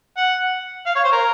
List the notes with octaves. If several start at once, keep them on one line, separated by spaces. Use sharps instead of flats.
F#5
F5
C#5
C5
A#4